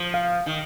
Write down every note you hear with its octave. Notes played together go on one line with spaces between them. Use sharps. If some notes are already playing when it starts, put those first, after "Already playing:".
Already playing: F3
F5
D#3